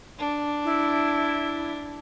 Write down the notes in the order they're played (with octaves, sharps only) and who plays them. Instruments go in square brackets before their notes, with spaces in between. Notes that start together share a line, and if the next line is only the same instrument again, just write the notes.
[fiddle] D4
[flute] E4